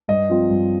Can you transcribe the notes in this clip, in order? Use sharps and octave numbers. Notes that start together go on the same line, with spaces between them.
G2 D#5
F3 C4 F4
G2